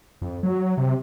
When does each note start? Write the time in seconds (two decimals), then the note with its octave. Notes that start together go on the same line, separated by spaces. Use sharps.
0.22 F2
0.43 F#3
0.78 C3